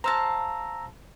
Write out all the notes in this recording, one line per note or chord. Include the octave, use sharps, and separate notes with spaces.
C5 F5 A5 A#5 E6 A#6